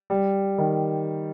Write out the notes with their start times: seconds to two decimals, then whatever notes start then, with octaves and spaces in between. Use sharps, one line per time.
0.10 G3
0.58 D#3